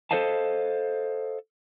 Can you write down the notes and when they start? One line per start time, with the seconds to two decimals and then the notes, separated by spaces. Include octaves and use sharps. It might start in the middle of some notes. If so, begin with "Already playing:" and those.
0.11 A4 A#4 C5 D#5 F5 A5